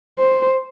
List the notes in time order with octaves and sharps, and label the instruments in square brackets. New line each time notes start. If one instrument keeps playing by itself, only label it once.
[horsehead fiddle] C5